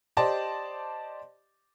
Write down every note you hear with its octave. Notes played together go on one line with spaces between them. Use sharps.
G4 C5 D5 D#5 A5